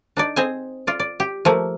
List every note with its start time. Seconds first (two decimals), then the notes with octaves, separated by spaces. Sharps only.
0.17 D4 D#4 D5
0.36 C4 G#4 C5 D#5 G#5
0.87 F4 D5
1.00 D5
1.20 G4
1.45 F3 A3 A#3